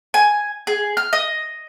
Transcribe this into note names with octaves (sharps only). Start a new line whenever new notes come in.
G#5
G#4
F6
D#5